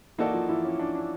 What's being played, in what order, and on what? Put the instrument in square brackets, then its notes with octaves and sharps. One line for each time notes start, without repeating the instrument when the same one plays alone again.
[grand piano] E3 E4 [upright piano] A#3 D#4 F#4 A4 D5
[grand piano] F3 F4
E3 E4
C#4
D4
D4